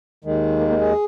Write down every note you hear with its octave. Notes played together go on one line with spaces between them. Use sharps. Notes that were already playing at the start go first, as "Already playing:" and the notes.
D#2 D#3 G#3
A#3
A#3
G#4